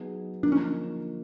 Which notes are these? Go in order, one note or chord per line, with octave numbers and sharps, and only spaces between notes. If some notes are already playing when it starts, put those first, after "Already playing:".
Already playing: F#3 B3 D#4 G#4
D3 F3 A#3 D4 D#4
C#4